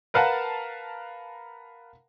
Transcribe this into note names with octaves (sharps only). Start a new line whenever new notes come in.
A#4 B4 F5 F#5 A5 A#5